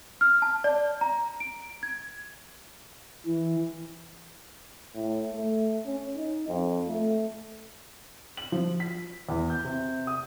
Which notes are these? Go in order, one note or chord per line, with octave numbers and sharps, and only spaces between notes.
F6
A5
D5
A#5
D7
G#6
E3
A2
A3
C#4
D#4
F2
A3
F#7
F3
B6
E2
G6
C3
D#6